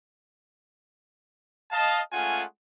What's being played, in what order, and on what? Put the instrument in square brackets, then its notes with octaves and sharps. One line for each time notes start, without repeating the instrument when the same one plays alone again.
[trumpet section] D#5 F5 A5
G#3 A3 C#4 F4 F#5 G#5